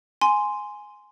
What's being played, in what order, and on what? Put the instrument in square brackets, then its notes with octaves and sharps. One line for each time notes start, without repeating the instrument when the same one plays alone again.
[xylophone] G#5 C6